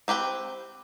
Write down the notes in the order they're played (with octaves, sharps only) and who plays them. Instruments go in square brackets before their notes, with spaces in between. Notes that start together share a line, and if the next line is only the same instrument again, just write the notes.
[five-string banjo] C4 G4 B4 G5